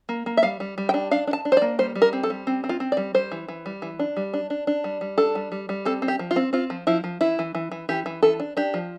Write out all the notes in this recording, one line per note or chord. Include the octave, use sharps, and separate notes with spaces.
A#3
A#3
E5
G3 F5
G3
G3
G5
D4
D4 F5
D4
A5
D4
C5
D5
A#3
G3 C5
G3
A#4
C4
A4
G3
C4
C4
F4
C4
D5
G3
G3 C5
E3
E3
G3
E3
D4
G3
D4
D4
D4
G3
G3
D4 A4
G3
G3
G3
C4 A4
C4
G4
F3
F4
C4
C4 F4
F3
F3 E4
F3
E3 E4
E3
E3
E3
E3 G4
E3
E3 A4
D4
D4 G4
F3